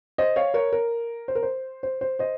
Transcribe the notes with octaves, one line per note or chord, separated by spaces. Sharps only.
C5 D#5
C#5 F5
A#4 C#5
A#4
C5
A#4
C5
C5
C5
C5 D#5